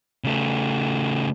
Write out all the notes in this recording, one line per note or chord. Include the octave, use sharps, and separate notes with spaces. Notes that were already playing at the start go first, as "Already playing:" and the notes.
C#3 A3